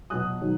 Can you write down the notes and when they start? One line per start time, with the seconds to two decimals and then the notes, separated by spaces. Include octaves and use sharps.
0.10 B2 F#3 D#6 F#6
0.41 D#3 F#3